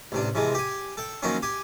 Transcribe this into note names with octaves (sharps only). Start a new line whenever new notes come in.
A1 C3 D4
C3 E3 F3 G#3
G4 G#5
A4 G5
D#3 F3 F#3 A#3 C4 C#4
G4 G#5